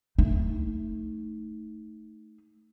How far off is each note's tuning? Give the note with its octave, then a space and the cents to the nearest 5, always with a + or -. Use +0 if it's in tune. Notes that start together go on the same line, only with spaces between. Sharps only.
A3 +0 D#4 +15